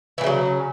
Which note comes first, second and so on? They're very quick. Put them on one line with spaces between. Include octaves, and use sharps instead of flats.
E3 A#2 C#3 F#3